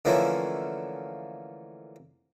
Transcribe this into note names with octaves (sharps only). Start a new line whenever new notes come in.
D3 E3 F3 A3 A#3 C#4